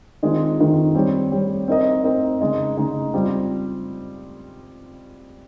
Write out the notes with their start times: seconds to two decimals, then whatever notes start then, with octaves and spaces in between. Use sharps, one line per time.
0.23 D#3 G#3 C4 F4
0.58 D#3 G#3 C4 F4
0.95 G3 C4 G4 C#5
1.32 G3 C4 G4 C#5
1.68 C4 D#4 A#4 D#5
2.04 C4 D#4 A#4 D#5
2.41 C#3 G#3 D#4
2.77 C#3 G#3 D#4
3.14 G3 C4 F4